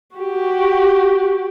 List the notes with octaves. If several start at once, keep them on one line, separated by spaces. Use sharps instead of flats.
F#4 G4